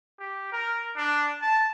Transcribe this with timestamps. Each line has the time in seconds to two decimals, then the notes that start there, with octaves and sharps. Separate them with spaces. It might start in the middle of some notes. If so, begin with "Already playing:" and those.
0.20 G4
0.52 A#4
0.97 D4
1.42 A5